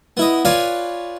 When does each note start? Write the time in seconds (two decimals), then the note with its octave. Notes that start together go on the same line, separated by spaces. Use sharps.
0.17 B3 E4 D#5
0.45 F4 B4 C#5 D5 F5 G#5